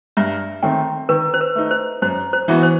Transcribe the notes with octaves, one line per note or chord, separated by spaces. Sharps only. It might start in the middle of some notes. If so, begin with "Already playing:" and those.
G2 E5
D#3 A3 C4 G5
D#3 B4
C5
B4
A3 D#4
C5
F#2 C5
C5
E3 B3 F#4
C5